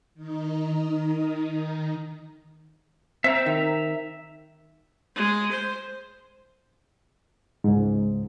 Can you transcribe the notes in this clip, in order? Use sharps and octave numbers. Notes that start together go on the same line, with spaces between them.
D#3 D#4
C4 E5 A#5
D#3
G#3
C5
C#2 G#2